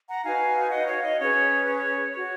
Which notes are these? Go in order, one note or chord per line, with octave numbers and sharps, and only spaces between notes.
F#5 A#5
D#4 F#4 B4 F5 G#5
D#5 F#5
C#5 F5
D#5
C#4 G#4 B4 C#5
C#5
F#4 C#5